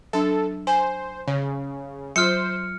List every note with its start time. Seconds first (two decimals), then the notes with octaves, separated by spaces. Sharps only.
0.13 F#3 D4 A4
0.67 C5 G#5
1.28 C#3 C#5
2.16 F#3 F4 C5 F6 C#7